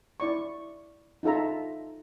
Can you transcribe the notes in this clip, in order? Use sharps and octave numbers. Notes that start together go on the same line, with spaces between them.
E4 D5 C#6
D#4 F4 A4 E5 A#5